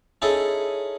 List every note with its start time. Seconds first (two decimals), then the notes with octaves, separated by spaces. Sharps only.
0.22 C#4 D#4 E4 G#4 A4